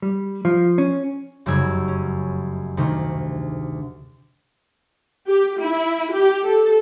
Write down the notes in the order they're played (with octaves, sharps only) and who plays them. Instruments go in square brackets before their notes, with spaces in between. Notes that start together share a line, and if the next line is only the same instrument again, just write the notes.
[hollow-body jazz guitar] G3
F3
C#4
[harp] F1 F#2 C#3 G3 E6 G#6
C#4
D2 C3 D#3
[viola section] G4
E4
G4
A4